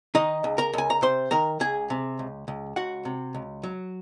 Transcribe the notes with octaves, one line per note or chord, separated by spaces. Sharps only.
D#3 D#4 D#5
C#2
A#4 A#5
C#2 G#5
A#5
C3 C5 C6
D#3 A#4 A#5
C#2 G#4 G#5
C3
C#2
C#2
C#2 F#4 F#5
C3
C#2
F#3